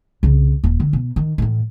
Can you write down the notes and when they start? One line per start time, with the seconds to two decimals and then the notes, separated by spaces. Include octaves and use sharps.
0.23 C2 C#3
0.64 D#1
0.80 D3
0.93 B2
1.16 D#3
1.38 A2 E3